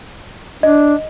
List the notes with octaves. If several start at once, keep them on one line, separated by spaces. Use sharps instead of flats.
D4 D#5